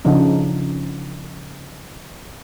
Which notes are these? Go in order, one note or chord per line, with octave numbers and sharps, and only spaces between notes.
C#3 F3 D4 D#4